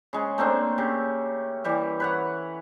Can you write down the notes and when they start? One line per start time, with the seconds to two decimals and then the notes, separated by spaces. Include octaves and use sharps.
0.13 C#3 G#3 C6
0.38 A3 A#3 C4 D4
0.78 C#3 G4
1.64 E3 G3 G4
2.00 B4 C#5 F#5